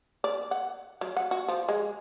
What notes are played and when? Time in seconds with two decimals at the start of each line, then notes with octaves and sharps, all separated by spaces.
0.24 D5
0.51 F#5
1.01 F#3
1.17 F#5
1.31 F#4
1.48 F3
1.69 G#3